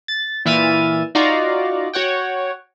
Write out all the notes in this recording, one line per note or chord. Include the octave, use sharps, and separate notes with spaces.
A6
A#2 E3 E5 F6 A6 D#7
D#4 F4 F#4 D5 F5 A#5
F#4 C#5 F#5 G5